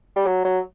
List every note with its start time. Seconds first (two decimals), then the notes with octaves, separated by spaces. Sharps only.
0.16 G3
0.26 F#3
0.45 F#3